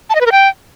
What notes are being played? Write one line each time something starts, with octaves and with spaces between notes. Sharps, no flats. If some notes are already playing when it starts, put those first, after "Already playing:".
A5
D#5
B4
A#4
G5